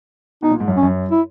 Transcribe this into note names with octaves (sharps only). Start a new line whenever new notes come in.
B2 D#4
A#2
G#2
F#2
C#4
F#2
E4